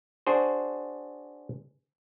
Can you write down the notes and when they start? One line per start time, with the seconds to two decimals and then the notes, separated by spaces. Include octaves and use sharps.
0.27 D4 F#4 G#4 C5